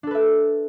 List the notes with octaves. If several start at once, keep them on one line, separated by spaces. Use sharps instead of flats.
D4 A4 B4 E5